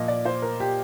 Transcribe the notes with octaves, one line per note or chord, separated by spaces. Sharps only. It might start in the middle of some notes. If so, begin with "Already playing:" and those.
Already playing: A#2 F3 D#5
D5
C5
A#4
G4